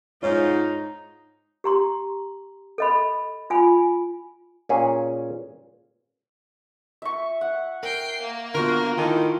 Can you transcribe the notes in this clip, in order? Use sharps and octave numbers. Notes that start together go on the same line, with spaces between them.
G#2 D#4 F4 C#5
G4 A#5 C6
A4 D#5 B5
F4 G#5 B5
A#2 C#4 G#4
E5 C#6
F#5
A#4 G5 C7
A#3
D3 B3 F4 F#4 A#4 C5
D#3 E4 A4 A#5 C6